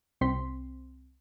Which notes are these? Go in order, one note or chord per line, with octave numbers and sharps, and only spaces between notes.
C2 C4 C6 B6